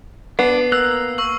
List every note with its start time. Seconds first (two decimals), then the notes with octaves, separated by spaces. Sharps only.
0.39 B3 D4 C7
0.72 A#3 A#4 E6 F#6
1.18 C#6 E6 F#7